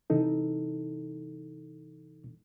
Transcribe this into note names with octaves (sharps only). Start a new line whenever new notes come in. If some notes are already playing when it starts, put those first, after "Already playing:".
C3 E3 D#4 A4